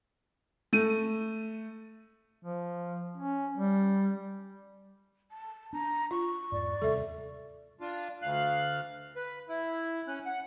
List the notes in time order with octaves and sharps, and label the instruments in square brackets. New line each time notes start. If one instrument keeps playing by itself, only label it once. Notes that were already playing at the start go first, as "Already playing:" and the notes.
[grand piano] A3 D#7
[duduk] F3
C#4
G3
[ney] A5
[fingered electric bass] D4 [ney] A#5
[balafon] F4 [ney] C#6
[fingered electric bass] E2 G#2 [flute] D5
[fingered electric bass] D#2 C3 G3 [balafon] A4 E5
[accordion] D4 F4
D2 F5 F#6
B4
E4
C#4 F#6
F#5